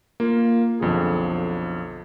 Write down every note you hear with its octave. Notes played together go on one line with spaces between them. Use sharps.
A#3 F4
B1 F2 D3 G#4